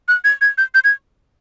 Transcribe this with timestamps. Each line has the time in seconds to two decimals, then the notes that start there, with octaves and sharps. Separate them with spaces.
0.08 F#6
0.24 G#6
0.41 G#6
0.58 G6
0.75 G6
0.84 G#6